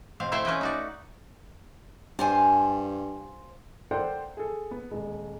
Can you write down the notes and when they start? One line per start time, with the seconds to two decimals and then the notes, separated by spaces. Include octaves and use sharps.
0.20 B2 C4 F5
0.32 A3 E4 C5 E5 F5 G5
0.45 C#4 B4 D#5 G5
0.61 D#4 F#4 D5
2.19 G2 F4 C5 G#5
3.91 A4 A#4 C5 D5 F#5 G5
4.37 G#4 A4
4.71 B3
4.91 D#1 G#3